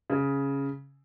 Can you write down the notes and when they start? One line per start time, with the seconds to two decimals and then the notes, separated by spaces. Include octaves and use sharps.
0.10 C#3